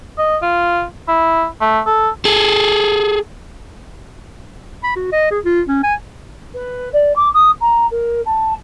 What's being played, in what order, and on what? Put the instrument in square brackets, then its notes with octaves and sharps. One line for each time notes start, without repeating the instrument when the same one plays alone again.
[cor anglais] D#5
F4
E4
A3
A4
[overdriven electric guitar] G#4 A4
[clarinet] B5
F#4
D#5
G#4
F4
C#4
G#5
[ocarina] B4
D5
D6
D#6
A#5
A#4
A5